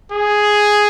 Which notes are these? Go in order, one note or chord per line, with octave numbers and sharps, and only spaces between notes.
G#4